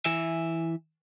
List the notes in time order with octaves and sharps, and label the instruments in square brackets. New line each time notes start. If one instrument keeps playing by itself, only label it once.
[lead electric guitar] E3 E5